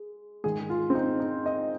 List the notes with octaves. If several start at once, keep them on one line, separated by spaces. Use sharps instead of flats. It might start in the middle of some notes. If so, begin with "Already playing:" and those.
Already playing: G#3
G#2 D#3 G#3 G#4
F4
C4
D#4
D#4
D#5